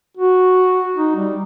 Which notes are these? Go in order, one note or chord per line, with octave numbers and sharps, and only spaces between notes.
F#4
D#4
G3